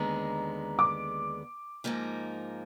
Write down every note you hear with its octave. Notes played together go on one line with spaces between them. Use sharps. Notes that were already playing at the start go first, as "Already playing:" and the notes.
Already playing: D#2 D3 G#3 B3 A#5
D6
G#2 F3 A#3 D#4